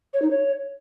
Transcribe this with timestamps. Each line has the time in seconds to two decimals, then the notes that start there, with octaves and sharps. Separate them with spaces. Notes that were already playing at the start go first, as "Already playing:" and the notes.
0.14 C#5
0.22 D#4
0.31 C#5